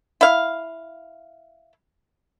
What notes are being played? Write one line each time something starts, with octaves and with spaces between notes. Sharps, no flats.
E4 F5